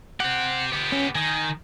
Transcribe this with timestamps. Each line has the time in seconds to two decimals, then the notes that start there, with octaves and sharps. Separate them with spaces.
0.20 C4 G4 F#5
0.72 B3 G4
0.92 C#4
1.15 D#3 G#5